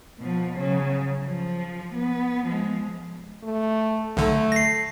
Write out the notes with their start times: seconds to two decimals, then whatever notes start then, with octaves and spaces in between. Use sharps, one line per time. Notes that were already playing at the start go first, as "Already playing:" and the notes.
0.20 B2 F3
0.57 C#3 F#3
1.23 F3
1.94 B3
2.46 F3 G#3
3.43 A3
4.17 B1 D3 A3
4.52 A#6 C7